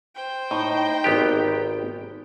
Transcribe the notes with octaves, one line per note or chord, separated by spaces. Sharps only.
C5 G5
A2 D#4
G#1 B3 G4